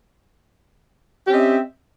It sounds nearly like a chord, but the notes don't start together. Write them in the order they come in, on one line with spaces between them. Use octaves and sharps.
G4 C#4 C4 D#5 E5